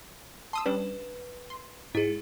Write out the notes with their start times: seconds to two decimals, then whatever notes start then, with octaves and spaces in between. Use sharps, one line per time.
0.53 A5 C6 D#6 E6
0.66 G3 C#4 D4 B4
1.50 C6
1.95 G#2 E4 G#4